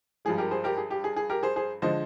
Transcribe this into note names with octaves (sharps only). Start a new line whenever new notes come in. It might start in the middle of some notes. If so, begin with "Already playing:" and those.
G2 F3 G#3 G#4
G4 A#4
G#4 C5
G4 A#4
G#4
G4
G#4
G#4
G4 A#4
G#4 C5
G#4 C5
D3 F3 G#3 C5 D#5